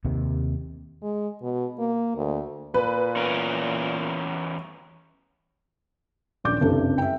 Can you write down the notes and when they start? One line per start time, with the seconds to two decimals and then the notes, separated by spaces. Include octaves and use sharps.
0.05 D#2 C3 D#3
1.02 G#3
1.42 B2
1.79 A#3
2.16 D2
2.74 A#2 B4
3.16 E2 C#4 A#4
6.44 D#1 A#1 D5 D6 G6
6.60 F#1 C2 G2 C3 D4 A4
6.98 E5 G5